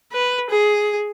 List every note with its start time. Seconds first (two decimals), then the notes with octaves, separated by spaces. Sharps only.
0.13 B4
0.50 G#4